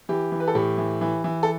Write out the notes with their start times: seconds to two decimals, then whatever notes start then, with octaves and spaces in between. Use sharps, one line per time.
0.09 E3 G4
0.32 E3
0.40 B4
0.48 A4
0.55 A2 G4
0.78 E3
1.01 E3
1.24 E3
1.43 A4